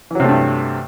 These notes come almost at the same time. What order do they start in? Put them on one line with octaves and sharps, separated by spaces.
E3 F#3 C3 A3 G2